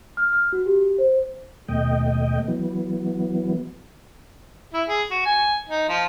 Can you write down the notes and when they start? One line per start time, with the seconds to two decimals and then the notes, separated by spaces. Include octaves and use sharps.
0.17 F6
0.33 F6
0.52 F#4
0.66 G4
0.98 C5
1.68 D#2 B2 A3 D#5 G5
2.48 E3 F#3 B3
4.73 E4
4.88 G#4
5.10 F#4
5.26 G#5
5.69 D#4
5.89 F3